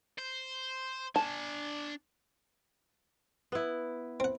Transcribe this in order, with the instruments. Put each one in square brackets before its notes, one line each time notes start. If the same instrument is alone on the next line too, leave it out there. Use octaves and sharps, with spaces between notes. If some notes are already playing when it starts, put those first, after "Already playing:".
[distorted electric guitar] C5
[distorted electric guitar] D4 G#5 [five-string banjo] A5
[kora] B3 E4
[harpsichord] C4 F#5